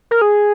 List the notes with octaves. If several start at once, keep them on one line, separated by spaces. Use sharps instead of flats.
A#4
G#4